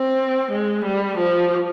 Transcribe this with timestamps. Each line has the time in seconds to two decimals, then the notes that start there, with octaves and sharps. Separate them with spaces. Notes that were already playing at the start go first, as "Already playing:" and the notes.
Already playing: C4
0.52 G#3
0.85 G3
1.18 F3